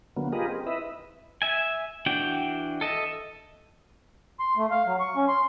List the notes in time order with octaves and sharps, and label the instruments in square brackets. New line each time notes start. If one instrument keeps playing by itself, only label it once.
[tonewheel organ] D3 F#3 A#3 B3
F4 G4 G#4 A#4 B4 D#5
C4
E4 B4 D#5 E5
[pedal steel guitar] E5 G#5
E3 D4 F#4 G5
A4 D#5 E5
[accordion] C6
A3
F5
F#3
C#6
C#4
C6